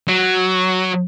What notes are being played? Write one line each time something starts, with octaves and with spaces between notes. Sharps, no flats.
F#3